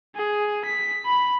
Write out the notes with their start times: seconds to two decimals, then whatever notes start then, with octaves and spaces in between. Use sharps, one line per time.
0.15 G#4
0.65 B6
1.06 B5